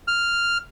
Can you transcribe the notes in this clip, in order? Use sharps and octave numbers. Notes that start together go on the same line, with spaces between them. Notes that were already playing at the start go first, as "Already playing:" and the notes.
F6